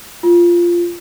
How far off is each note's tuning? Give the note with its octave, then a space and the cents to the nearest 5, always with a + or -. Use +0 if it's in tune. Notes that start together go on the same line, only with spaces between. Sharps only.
F4 -10